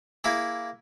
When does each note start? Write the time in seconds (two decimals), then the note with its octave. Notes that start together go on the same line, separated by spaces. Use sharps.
0.24 A#3 E4 G#4